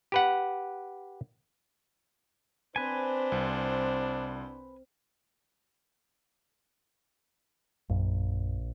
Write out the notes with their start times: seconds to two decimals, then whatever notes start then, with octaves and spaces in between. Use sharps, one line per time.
0.12 G4 B4 F#5
2.76 C4 D4 B4 C5 G#5
3.32 C2
7.90 A#1 F#2